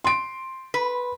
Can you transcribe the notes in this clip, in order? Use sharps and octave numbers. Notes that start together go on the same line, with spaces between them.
C6 D7
B4